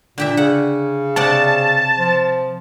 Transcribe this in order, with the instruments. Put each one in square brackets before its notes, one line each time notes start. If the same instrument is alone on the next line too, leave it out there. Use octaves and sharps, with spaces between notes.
[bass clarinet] A#2 [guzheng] D3 G4 E5
[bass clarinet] C#3 [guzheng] F#5
[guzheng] C3 D5 F#5 [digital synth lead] A5
[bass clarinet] F3